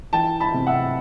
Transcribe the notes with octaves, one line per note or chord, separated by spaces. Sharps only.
E3 G5 A5
A5 B5
C3
E5 F#5